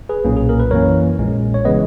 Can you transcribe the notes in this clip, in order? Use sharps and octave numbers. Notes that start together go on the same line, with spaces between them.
G#4 B4
B1 A#2 A#3 C#4
G#4
A#4
B4
F#2 E3 A#3 C#4 A#4 C#5
A#1 A#2 G#3 C#4
C#5
C#3 E3 G#3 B3 B4 D#5